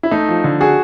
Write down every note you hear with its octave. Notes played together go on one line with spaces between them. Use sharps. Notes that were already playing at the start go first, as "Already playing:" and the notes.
E4
A3 D#4
F3
D3
F#4 G#4